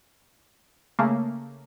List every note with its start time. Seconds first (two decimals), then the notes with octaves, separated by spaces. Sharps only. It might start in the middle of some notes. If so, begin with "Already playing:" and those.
0.99 C#3 A3 A#3